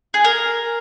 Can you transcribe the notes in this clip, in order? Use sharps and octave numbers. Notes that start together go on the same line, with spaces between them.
G#4
A#4